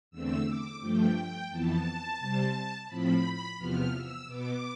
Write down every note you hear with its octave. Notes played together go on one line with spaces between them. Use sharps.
E2 D3 A3 C4 E6
D6
G2 F3 A3 G5
G5
F2 E3 B3 A5
C3 G3 C4
A2 F3 C4 B5
E2 C3 F3 B3 F6
E6
B2 B3 D6